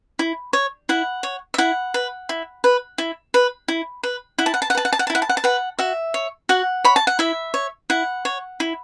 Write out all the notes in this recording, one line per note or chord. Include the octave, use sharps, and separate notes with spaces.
E4
C#5
E4 F#5
C#5
E5
E4 F#5
B4
E4
B4
E4
B4
E4
B4
E4 F#5
A5
F#5
A5
F#5
B4 A5
F#5
A5
F#5
A5
E4
F#5
A5
F#5
A5
B4 F#5
F#4 E5
C#5
F#4 F#5
C#5 B5
A5
F#5
E4 E5
C#5
E4 F#5
C#5
E4